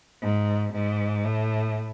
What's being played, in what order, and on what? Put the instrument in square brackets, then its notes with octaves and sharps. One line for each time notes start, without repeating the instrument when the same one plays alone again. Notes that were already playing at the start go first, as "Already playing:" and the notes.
[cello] G#2
G#2
A2